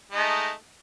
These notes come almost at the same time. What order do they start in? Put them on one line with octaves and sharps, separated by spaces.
G#3 D#4 A3